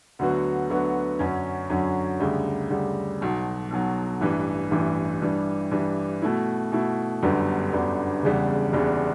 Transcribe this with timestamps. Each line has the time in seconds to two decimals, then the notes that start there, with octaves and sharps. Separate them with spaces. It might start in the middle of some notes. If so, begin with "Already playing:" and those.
0.19 D2 D3 F#3 B3 F#4
0.69 D2 D3 F#3 B3 F#4
1.19 F#2 D3 F#3 C#4
1.70 F#2 D3 F#3 C#4
2.20 D2 C#3 G3
2.70 D2 C#3 G3
3.21 B1 B2 F#3
3.71 B1 B2 F#3
4.20 A1 G2 E3
4.71 A1 G2 E3
5.22 G2 E3 G3
5.71 G2 E3 G3
6.22 B2 A3 E4
6.72 B2 A3 E4
7.22 G1 F#2 D3 G3 B3
7.72 G1 F#2 D3 G3 B3
8.23 F#1 E2 C#3 G3 D4
8.73 F#1 E2 C#3 G3 D4